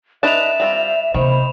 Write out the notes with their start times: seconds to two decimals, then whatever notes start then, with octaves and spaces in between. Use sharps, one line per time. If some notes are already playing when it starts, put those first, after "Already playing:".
0.23 D4 D#4 B4 E5 E7 F7
0.60 G3 C4 F4
1.14 C3 D#3 A#3 C5 B5